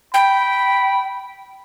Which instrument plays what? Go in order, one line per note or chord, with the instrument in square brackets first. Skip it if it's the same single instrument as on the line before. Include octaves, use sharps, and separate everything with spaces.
[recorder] G5 [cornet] B5